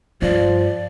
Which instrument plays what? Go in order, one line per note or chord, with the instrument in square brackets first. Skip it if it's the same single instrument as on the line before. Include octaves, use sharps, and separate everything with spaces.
[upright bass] G2 [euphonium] F3 [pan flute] D5